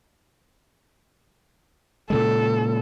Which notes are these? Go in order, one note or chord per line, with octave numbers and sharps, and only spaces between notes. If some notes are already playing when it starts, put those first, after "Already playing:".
A#2 C#3 G#3 A4